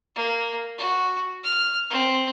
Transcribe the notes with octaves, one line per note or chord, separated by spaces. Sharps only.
A#3
F#4
F6
C4